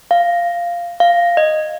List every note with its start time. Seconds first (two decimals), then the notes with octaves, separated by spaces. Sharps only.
0.11 F5
1.00 F5
1.37 D#5